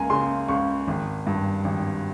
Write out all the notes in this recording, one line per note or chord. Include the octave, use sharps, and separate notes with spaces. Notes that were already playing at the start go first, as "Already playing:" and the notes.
Already playing: C#2 A#3 G#5 A#5
C#3 C6
C#2 C#6
G#1
G2
G#1